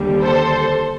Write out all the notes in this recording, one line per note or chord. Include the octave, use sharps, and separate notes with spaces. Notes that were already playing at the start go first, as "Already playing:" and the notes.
Already playing: D#2 D3 G3
A4 C5